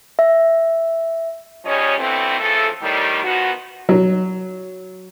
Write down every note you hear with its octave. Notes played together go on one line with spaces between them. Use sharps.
E5
G#2 F3 G3 C#4 C#5 D#5
B2 D3 E3 A3 C4
C#3 E3 F3 A3 A4
A2 D#3 G3
D#3 F3 B3 F#4
F#3